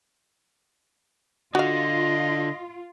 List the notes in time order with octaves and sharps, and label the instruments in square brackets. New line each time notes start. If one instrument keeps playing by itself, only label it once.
[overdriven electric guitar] D3 [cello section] F4 [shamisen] F#4 F5 [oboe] D#5